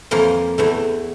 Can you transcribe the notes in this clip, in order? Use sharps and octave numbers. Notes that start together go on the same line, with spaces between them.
F2 E3 A#3 F4
E2 E3 A3